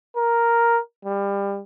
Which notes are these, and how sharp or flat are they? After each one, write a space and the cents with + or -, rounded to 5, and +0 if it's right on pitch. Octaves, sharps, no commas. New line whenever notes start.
A#4 +5
G3 +25